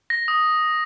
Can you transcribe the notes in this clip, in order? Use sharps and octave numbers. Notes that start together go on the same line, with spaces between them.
A#6
D#6